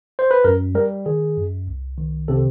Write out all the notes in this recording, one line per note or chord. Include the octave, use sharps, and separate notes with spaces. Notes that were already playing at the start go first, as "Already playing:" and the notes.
C5
B4
F#2 A#4
G3 A#4
D#3 G#4
F#2
C2
D#3
C3 A4